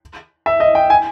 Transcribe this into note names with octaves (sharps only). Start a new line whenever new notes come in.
E5
D#5
G5
G#5